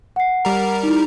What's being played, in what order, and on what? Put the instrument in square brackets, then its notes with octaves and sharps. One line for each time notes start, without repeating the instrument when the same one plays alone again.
[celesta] F#5 C7
[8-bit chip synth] G3 A#4
[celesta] D#4 E4